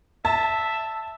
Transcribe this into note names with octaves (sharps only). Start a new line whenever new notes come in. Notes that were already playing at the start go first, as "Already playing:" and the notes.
E5 A5